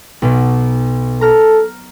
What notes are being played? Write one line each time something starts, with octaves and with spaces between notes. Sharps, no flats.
B1 B2
A4 A#5 F6 A#6